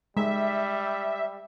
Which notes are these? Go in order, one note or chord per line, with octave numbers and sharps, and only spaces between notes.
G3 G#3 E5